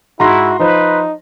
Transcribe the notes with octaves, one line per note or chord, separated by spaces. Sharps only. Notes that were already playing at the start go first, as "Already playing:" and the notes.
G#2 G#3 E4 F#4 A#5 C6 A#6
F3 D#4 B4 C5